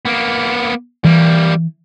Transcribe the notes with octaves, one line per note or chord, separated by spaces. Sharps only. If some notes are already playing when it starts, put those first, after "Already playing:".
A#3 B3
E3 G3 A#3